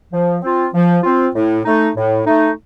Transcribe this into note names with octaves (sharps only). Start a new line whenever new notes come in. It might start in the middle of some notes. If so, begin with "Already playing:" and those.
F3
C4 F4
F3
C4 F4
A2
A3 D#4
A2
A3 D#4